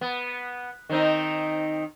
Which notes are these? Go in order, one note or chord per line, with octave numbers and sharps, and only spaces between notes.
B3
D#3 C4 D#4